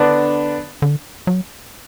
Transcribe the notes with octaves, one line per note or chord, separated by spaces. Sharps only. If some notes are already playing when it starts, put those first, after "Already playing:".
Already playing: D3 B3 D4
D3
F#3